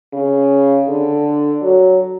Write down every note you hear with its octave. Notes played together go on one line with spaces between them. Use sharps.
C#3
D3
F#3